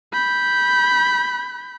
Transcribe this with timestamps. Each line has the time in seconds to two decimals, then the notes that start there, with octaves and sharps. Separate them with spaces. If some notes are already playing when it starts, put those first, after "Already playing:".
0.13 B5 G6